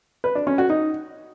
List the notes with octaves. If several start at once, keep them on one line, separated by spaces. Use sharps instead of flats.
B4
D4
C#4
F#4
D#4